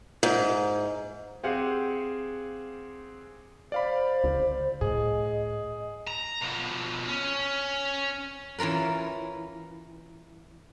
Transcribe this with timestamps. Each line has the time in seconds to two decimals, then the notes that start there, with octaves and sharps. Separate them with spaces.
0.23 G#2
1.44 C4 G4 G#4 F5 F#5
3.72 C5 D5 F5 B5
4.24 C#2 D3
4.81 A2 G#4 D#5
6.08 A#5
6.42 B2 F3
7.08 C#4
8.58 E3 C#4 F4 A#4 B4